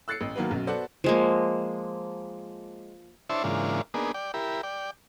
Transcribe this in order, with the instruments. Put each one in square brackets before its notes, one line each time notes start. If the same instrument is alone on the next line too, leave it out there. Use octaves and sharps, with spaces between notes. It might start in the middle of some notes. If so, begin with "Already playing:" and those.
[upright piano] E6 F#6 A6 C7 C#7
A1
D#3 F#3 A#3 B3 B4
B1 F#2
B3 F#4 A4 C5 D5 F#5
[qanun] F3 G#3 A#3
[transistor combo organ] D4 E4 C5 C#5 E5 A5
G#2 C#3 E3 A#3 D4 F4
A#3 B3 D4 D#4 G#4
D5 G5
E4 G4 A#4 B5
D5 G5